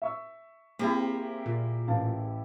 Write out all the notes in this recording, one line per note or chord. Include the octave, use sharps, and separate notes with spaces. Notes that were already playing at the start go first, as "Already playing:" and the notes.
E5 C#6 E6
A#3 C4 E4 G4 G#4
A#2
A1 F5 A5